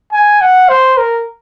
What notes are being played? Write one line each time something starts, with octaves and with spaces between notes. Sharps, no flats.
G#5
F#5
C5
A#4